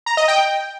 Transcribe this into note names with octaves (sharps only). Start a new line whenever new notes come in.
A#5
D#5
G5